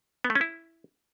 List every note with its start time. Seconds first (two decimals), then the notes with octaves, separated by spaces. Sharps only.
0.24 B3
0.30 A3
0.35 C#4
0.41 E4